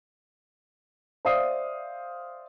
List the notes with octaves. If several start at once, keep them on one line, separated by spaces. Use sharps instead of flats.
C5 D5 E5 F5 D#6 C7